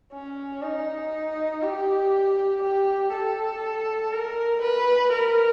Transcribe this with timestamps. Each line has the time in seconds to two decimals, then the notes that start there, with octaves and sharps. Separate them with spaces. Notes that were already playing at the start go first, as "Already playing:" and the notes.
0.13 C#4
0.62 D#4
1.62 G4
2.62 G4
3.12 A4
4.12 A#4
4.62 B4
5.12 A#4